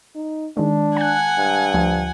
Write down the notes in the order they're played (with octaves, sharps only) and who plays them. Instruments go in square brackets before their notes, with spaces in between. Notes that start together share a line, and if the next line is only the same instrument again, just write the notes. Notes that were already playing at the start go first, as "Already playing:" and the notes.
[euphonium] D#4
[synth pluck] D#3 G#3 [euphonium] D4
[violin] F#5 G#5 [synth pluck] A5 F#6
[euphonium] G2
[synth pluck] D2 F3